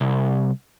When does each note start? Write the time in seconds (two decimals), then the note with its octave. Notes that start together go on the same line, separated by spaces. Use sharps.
0.01 C2